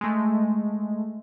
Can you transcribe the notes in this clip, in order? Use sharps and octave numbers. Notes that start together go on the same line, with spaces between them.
G#3 A3